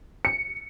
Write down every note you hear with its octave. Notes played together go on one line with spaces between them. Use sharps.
C#7